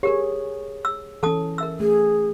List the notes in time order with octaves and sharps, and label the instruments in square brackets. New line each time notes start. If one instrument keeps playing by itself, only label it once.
[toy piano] G4 A#4 [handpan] G#4 C#5
[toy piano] E6
[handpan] E3 C#4 [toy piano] A4 A5 D#6
[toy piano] A#4 E5 E6
[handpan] A3 [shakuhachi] G#4